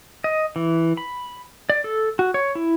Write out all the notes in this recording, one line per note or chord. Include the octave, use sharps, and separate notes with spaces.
D#5
E3
B5
D5
A4
F#4
C#5
E4